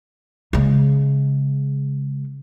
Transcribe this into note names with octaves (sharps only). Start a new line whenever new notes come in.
C#3 G#3